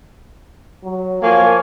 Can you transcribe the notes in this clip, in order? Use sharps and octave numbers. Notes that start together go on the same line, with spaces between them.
F#3
F3 A#3 A#4 C#5 G#5